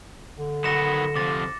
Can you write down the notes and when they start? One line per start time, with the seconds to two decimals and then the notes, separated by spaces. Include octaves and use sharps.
0.39 D3
0.64 D#3 F#3 B3 A#6 C#7 E7
1.16 C3 F3 D6 A6